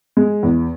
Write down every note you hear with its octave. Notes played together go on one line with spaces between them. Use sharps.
G#3
E2